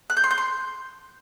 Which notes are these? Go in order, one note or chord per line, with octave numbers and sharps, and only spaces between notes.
F#6
G6
C6
G6
C6